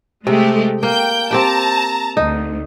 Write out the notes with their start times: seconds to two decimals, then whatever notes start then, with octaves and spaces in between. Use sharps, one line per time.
0.27 C3 G#3 A3 G4
0.83 A#3 G5 G6
1.31 C4 G4 G5 A5 A#5
2.17 D2 D#4